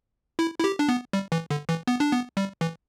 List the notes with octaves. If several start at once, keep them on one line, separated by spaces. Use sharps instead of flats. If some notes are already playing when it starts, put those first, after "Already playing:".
E4
E4
G4
D4
B3
G3
E3
D3
E3
B3
D4
B3
G3
E3